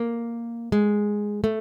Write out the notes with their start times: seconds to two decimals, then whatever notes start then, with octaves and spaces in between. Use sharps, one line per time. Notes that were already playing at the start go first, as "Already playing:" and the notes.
Already playing: A#3
0.72 G#3
1.44 A3